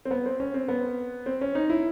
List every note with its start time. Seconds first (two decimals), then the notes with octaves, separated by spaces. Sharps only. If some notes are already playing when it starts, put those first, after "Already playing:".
0.05 C4
0.11 B3
0.26 C4
0.40 C#4
0.54 C4
0.68 B3
1.26 C4
1.41 C#4
1.55 D#4
1.70 E4